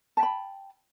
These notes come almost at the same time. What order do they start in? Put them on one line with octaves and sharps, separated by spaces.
A5 G5 B5